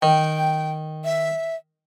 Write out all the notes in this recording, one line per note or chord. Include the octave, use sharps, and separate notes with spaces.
D#3 G5
E5